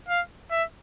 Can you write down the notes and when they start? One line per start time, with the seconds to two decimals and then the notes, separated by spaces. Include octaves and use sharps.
0.08 F5
0.51 E5